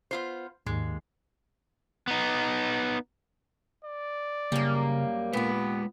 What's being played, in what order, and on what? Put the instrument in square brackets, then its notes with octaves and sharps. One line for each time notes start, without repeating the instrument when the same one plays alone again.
[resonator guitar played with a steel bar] B3 F4 C5
[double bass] D#2 [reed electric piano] G#2 [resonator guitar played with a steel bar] G#3
[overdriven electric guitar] B3 D#4
[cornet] D5
[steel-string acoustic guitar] F#2 G3 [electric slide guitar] C#3 [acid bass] A#3
[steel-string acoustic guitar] A#2 G4 [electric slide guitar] G#3 B4 [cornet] B3